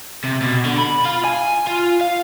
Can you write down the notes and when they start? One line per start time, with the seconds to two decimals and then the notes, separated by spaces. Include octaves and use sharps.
0.24 C3
0.42 B2
0.65 D3
0.78 B5
1.05 F4
1.24 G#5
1.67 F4
2.01 F5